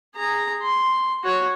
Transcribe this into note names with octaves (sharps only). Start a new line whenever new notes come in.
G#4 A#5
C6
F#4 C#5